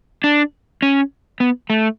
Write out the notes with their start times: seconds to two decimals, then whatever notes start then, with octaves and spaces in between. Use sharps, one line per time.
0.24 D4
0.82 C#4
1.40 B3
1.70 A3